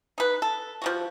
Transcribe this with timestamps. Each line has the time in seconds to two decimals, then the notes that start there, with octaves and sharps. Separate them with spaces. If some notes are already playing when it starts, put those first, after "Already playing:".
0.18 D#4 B4
0.42 A4
0.82 F3 G3 F#4